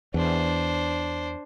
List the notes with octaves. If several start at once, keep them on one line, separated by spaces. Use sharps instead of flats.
E2 D4 C5